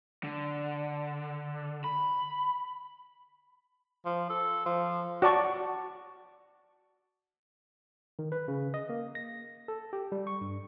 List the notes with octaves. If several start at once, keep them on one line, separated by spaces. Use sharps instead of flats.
D3
B5
F3
A4
F3
F#4 D5 A5 C#6
D#3
B4
C#3
D#5
A#3
A#6
A4
G4
G3
C#6
G2